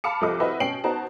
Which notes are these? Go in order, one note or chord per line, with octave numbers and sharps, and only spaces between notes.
F5 A5 B5 D6 F6 C#7
C2 F3 A4 D#5 D6
C4 E4 F#4 B4 D#5 E5
B2 C#4 G5 C7 D7 F#7
B3 D#4 F#4 C5 A5 A#5